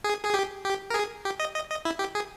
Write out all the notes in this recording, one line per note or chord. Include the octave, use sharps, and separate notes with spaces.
G#4
G#4
G4
G4
A#4
G#4
G4
D#5
D#5
D#5
E4
G4
G#4